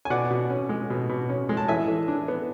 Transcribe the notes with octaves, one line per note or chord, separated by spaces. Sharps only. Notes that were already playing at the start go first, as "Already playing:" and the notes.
G#5
B2 D5 F#5
B2
C#4
G#3
B2
B2
C#4
G#3
A5
E3 E5 G#5
E3
D4
B3